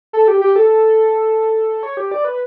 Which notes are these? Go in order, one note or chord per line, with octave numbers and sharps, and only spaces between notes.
A4
G4
G4
A4
C#5
G4
D5
B4